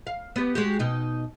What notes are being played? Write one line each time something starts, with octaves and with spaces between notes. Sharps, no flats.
F5
B3 G4
G#3 F#4 G4
B2 D#4